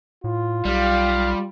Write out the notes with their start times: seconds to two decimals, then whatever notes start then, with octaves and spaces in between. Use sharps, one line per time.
0.24 A2 F4
0.65 B1 G3 F5